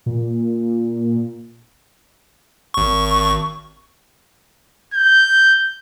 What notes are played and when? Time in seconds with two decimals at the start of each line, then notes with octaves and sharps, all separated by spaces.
0.06 A#2
2.74 G#1 C#6
4.94 G6